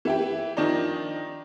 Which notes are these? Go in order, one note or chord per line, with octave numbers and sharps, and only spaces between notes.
E3 E4 G4
D#3 F3 D4 D#4